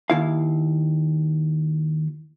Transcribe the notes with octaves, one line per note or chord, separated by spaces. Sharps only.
D#2 E4 F5